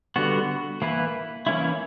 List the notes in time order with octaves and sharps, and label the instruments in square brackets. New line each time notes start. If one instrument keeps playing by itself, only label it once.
[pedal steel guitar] D3 G3 B3 F#4
E3 A#3 E4 B4
E3 A#3 C#4 E4